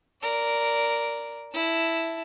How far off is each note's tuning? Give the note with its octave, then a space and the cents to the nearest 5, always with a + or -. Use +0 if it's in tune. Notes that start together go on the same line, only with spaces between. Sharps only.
A#4 +0 D5 -10
E4 +0 A5 +0